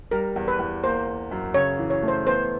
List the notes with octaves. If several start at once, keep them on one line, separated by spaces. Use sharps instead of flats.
G3 A#4
E2
B4
E2
A#3 C5
A#3
F#2
C#3 C#5
E3
C#5
A3
C5
B3 C5